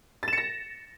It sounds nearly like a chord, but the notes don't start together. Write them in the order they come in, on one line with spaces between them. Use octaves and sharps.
A6 E7 C#7 A#6